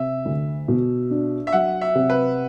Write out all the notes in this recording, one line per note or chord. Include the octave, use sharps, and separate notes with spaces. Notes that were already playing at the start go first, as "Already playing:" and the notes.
Already playing: C3 E5
D2
B2
D4
E5
F#3 F#5
E5
C3
B4